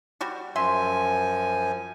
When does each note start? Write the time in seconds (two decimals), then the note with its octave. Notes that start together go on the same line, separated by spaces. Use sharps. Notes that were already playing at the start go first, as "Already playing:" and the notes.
0.21 G3 F#4 G4
0.56 F#2 F3 E5 G#5 C6